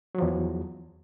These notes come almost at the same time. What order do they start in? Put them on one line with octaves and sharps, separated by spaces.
F#3 F3 E2